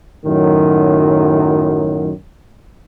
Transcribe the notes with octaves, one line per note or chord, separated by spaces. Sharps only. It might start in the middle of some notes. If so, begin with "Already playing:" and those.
F#2 A2 D#3 F#3